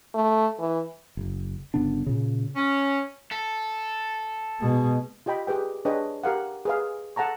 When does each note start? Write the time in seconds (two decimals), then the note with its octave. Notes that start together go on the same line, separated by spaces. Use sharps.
0.14 A3
0.59 E3
1.17 F#1
1.74 G1 C#3 B3 D4
2.06 A#2 C#3
2.56 C#4
3.32 A4
4.60 B2 G#3
5.26 F4 G4 D#5 G5 B5
5.47 G4 G#4 B4 G5
5.85 D4 G#4 B4 C#5 D#5 G5
6.24 G4 A#4 F5 F#5
6.65 G#4 B4 F5
7.16 A4 F#5 A5 A#5 C#6